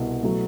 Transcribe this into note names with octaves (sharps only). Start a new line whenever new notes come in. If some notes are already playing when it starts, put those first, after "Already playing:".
Already playing: C2 B2
B2 F#3 A3